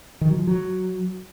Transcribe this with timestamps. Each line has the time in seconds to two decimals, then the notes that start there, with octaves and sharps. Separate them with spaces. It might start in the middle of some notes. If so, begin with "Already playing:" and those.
0.21 D#3
0.30 F#3
0.39 F3
0.47 F#3